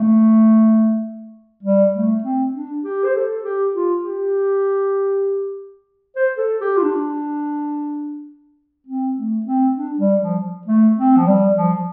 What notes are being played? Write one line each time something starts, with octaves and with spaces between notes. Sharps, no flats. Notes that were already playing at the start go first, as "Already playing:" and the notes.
Already playing: A3
G3
A3
C4
D4
G4
C5
A4
G4
F4
G4
C5
A4
G4
F4
D4
C4
A3
C4
D4
G3
F3
A3
C4
F3
G3
F3